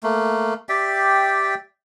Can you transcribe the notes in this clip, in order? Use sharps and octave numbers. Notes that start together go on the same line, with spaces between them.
A3 A#3
G4 D5 E5 G5